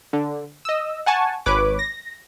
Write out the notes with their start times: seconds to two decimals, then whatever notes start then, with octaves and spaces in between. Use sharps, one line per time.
0.13 D3
0.65 D#5 E6
1.06 F#5 G#5 A5 C#6
1.46 G#1 B4 C#5 D6
1.79 A#6